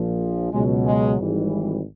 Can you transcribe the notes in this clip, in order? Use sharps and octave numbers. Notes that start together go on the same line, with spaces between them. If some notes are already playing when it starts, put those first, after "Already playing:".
Already playing: A#1 A#2 F3
C#2 B2 F#3 G#3
G#3
G#1 G#2 E3 G3